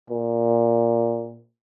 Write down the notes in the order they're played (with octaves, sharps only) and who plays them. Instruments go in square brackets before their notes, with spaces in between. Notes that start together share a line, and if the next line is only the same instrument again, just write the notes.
[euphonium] A#2